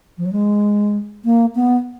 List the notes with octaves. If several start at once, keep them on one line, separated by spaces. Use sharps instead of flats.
F3
F#3
G#3
A#3
B3